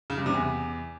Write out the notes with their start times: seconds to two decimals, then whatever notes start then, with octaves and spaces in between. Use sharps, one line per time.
0.10 C#3
0.18 G2
0.26 C3
0.34 E2